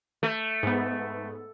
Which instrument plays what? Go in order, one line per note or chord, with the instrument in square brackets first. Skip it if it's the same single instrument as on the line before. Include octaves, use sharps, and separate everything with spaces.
[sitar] A3
[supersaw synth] G#2 B3